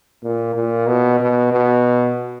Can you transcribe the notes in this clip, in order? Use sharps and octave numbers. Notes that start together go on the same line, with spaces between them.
A#2
A#2
B2
B2
B2